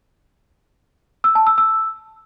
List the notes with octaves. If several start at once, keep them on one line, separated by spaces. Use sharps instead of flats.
E6
A5
E6
E6